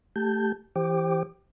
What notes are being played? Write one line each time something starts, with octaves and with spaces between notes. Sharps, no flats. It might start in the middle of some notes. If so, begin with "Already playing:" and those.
A3 G4 A5 G6
E3 G4 C5 G5 D6